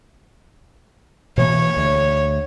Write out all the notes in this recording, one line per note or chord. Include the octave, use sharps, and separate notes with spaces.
B2 E3 A#3 C#5
D2